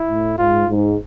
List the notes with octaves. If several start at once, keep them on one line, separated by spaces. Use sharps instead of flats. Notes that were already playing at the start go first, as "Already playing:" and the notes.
Already playing: E4
A2
G#2 F4
G#2